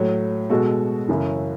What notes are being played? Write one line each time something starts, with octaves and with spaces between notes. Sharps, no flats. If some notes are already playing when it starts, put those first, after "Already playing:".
Already playing: A2 F#3 A3
B2 G#3 F#4 A4
F#2 C#3 E3